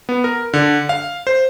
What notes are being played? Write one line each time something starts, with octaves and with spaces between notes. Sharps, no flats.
B3
A#4
D3
F5
C5